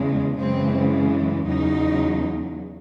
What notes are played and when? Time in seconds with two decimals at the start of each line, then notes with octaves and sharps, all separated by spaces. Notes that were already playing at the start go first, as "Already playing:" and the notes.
Already playing: E2 C#3 G#3
0.39 F#2 C#3 E3 G#3 C4
1.46 E2 C#3 F#3 D#4